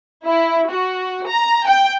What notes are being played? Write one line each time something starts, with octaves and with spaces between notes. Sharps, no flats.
E4
F#4
A#5
G5